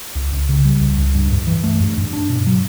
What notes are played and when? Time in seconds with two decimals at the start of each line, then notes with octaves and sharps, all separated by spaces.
0.15 C#2
0.32 C#2
0.49 C#3
0.65 G3
0.81 C#2
0.98 C#2
1.15 G2
1.31 G2
1.47 E3
1.64 A3
1.80 G2
1.97 G2
2.13 D4
2.30 B2
2.47 F#3